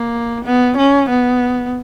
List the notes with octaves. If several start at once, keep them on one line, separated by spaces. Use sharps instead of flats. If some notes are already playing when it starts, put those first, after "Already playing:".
Already playing: A#3
B3
C#4
B3